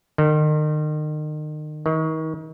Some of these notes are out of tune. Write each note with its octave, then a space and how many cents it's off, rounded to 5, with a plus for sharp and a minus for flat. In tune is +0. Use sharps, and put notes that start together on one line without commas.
D#3 -35
D#3 +35